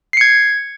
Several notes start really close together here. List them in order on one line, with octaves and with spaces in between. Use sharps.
C7 C#7 G#6